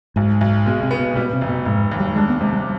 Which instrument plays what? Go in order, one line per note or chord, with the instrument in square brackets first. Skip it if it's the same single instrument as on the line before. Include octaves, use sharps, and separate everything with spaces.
[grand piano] B1 [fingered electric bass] G#2
[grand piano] B1
[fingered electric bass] B2 [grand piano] G#3
[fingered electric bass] C3
[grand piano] B3
[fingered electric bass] B2
[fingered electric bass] B2 [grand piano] G3
[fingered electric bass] C3
[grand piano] F1
[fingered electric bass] B2
[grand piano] F1 [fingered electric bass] G#2
[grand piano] D#2
[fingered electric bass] G3
[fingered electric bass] G#3 [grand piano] D4
[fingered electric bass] B3
[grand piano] C3 [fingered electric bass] G#3
[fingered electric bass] G3